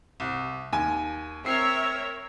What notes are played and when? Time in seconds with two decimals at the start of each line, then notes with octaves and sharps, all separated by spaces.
0.20 C2
0.73 D#2 G#5
1.45 C4 A#4 C#5 E5 C7